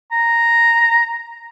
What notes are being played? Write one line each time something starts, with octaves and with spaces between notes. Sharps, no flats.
A#5